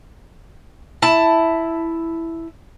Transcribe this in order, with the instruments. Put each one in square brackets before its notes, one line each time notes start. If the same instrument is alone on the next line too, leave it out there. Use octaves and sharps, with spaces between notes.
[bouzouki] E4 A5